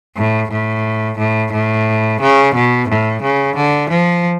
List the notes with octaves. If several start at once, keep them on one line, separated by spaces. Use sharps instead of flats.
A2
A2
A2
A2
C#3
B2
A2
C#3
D3
F3